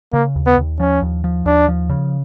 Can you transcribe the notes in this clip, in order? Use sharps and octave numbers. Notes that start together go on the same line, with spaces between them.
C#3 A#3
D#2
B3
D#2
F3 C#4
D#2
F3
D#2 D4
F3
C#3